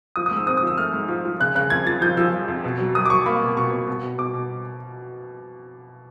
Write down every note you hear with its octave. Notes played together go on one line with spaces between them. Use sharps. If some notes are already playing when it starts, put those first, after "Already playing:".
F3 D#6
D#6
G#2
E6
C4 D#6
D#6
F3 E6
A3 F6
G#2
F3
F3
C#3 F#6
C#3 F#6
F2 G#6
F3 A6
F3 G6
F3 E6
F3
F2
B2
F#3
F#3 D#6
D6
F#3 C#6
A#3 B5
B2
B2 C#6
B2
B2
B2
B2 D6
B2